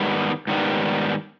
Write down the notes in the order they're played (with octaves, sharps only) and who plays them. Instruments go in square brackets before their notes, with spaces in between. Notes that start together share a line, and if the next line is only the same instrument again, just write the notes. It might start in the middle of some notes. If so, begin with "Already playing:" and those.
Already playing: [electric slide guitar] G#2 D#3 G3 B3
G#2 D#3 G3 B3